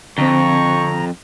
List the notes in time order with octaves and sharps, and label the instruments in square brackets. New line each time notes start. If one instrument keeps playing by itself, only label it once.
[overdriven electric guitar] F2 [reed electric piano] D3 C4 [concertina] A#5 [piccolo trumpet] C#6